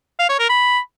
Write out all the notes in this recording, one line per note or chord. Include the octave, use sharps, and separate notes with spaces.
F5
C#5
A#4
B5